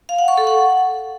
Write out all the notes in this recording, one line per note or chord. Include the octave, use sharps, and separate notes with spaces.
F5
F#5
C#6
A4
F#5